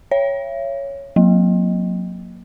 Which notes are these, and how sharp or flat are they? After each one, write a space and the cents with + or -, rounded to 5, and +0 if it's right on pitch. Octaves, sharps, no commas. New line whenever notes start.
C#5 +0 E5 +40
F#3 -25 A#3 +0